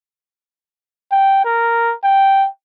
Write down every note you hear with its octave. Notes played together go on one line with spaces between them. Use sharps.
G5
A#4
G5